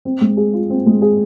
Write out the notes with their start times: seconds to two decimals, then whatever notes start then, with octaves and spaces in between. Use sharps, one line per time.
0.05 C4
0.21 G#3
0.37 G#4
0.54 F4
0.70 C4
0.86 G#3
1.02 G#4